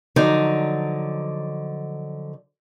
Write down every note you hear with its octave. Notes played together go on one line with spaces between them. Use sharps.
D3 F3 F#3 D#4 D5